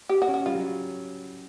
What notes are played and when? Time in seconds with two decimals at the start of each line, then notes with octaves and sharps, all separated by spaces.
0.09 G4
0.22 F#4
0.28 C#4
0.34 F#4
0.46 G3 F4
0.55 F#3